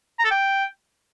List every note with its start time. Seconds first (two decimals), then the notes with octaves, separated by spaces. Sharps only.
0.19 A#5
0.25 A4
0.31 G5